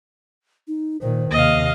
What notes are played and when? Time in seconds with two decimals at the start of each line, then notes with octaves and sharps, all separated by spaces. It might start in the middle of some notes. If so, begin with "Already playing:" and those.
0.68 D#4
1.01 A#2 D#3 C5
1.31 D#2 C3 A#3 D#5 F5